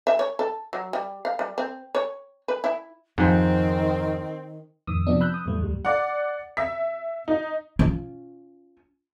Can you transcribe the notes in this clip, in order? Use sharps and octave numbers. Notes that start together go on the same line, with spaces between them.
E5
C#5
A4
F#3
G3
F5
G3
C4
C#5
B4
E4
F2 G#2 D#3 F3 C4
F2 A2 D#3 D#6 E6
C3 F3 B3 D4
B5 E6 F#6 G6
D#6
E2 A2 E3 G3 A3
D2 G2 G3
D5 F#5
E5 B6
D#4
C#4 F4